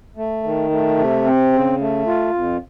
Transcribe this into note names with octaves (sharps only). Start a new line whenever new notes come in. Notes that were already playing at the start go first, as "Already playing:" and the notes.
A3
D#3
A3
C3
C4
C#3
A3
F4
F2